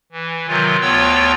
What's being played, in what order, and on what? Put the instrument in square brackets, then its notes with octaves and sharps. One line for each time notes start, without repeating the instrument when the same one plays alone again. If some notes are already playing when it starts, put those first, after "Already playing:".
[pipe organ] E3
C3 D#3 F#3 F4
D2 B3 F4 C#5 G5 E6